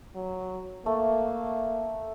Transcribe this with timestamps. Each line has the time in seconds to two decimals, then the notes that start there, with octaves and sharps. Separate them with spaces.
0.15 F#3
0.86 A3 A#3